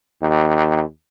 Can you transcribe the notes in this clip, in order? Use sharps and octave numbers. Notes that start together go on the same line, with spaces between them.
D#2